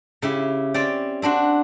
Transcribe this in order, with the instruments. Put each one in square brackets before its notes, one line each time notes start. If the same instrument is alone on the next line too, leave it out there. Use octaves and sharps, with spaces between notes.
[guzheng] C#3 E4 G4
C4 C#4 D5 G5
C4 D4 F#4 C5